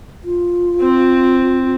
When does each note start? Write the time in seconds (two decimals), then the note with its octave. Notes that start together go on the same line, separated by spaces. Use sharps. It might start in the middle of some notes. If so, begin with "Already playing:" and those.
0.24 F4
0.81 C4